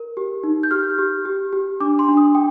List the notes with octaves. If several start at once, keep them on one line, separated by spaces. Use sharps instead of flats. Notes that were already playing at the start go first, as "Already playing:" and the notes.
Already playing: A#4
G4
D#4
G6
G4 F6
G4
G4
G4
D4 D6
C6
D4
D#6
G5